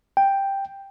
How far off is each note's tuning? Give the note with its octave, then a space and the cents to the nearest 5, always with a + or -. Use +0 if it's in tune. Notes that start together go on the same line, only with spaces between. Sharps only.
G5 +5